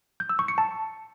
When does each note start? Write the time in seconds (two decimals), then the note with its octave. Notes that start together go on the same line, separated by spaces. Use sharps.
0.20 G6
0.29 E6
0.39 C#6
0.48 C#7
0.58 A5